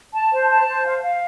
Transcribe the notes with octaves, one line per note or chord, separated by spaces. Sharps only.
A5
C5
A5
C5
F5
F5